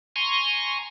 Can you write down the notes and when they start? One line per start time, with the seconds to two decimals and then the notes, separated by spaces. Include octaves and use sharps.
0.16 G#5 A#5 C6 C#6